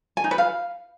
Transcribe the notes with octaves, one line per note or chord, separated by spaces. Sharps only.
G#5
D#4
B4
F5